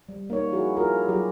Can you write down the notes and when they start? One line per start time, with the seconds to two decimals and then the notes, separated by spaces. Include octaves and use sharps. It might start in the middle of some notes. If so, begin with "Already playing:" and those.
0.09 G3
0.30 A#3 D#4 C#5
0.52 F3 E4 F#4 G#4 A#4
0.77 E4 F4 G#4 A#4
1.08 F#3 F4 G4 G#4